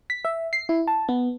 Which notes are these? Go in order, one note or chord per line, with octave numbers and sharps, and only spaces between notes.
B6
E5
C7
E4
A5
B3